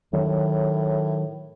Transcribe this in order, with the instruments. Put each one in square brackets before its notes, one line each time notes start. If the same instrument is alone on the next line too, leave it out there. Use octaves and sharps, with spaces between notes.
[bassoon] A2 [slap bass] D#3 F#3